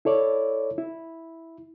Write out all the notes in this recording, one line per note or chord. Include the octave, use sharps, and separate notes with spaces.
E4 A4 C#5 D5
E4